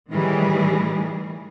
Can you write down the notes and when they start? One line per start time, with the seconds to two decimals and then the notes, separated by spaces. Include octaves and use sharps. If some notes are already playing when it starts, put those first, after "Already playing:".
0.11 A2 D#3 E3 G3 G#4